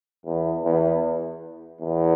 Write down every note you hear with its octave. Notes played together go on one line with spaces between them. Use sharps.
E2
E2
E2